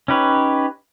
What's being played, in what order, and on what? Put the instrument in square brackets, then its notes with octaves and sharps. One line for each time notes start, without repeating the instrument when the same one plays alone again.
[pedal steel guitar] C#4 D#4 G4 B4 C#5